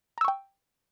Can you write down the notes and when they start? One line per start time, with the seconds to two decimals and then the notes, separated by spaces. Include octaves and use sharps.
0.18 A#5
0.21 E6
0.25 C#6
0.28 G5